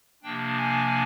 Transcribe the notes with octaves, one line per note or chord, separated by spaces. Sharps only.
C3 F3 A#3 D4 G5
G#5